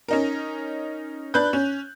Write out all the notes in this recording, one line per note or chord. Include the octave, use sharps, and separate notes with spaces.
C#4 D#4 A#4
D4 B4 F#6 G6
C#4